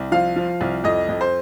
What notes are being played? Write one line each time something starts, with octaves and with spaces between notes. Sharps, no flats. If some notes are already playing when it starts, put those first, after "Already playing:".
Already playing: C2
F3 F5
F3
C2
F2 D#5
F2
C5